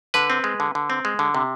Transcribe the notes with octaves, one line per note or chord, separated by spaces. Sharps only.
D3 B4
C4
G#3
D3
D3
C4
G#3
D3
C3